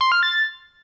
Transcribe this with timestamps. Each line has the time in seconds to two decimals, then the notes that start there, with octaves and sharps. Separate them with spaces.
0.01 C6
0.12 F6
0.23 A6